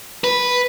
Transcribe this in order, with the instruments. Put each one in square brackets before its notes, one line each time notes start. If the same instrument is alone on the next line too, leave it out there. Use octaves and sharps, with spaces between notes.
[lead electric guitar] B4